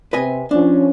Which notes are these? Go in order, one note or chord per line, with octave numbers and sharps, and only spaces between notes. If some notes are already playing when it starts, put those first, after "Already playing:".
C3 B4 D#5 G#5
F3 C#4 D4